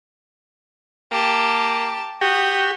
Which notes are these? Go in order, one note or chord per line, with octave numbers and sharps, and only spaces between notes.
A#3 G4 A5
F#4 G4 D#6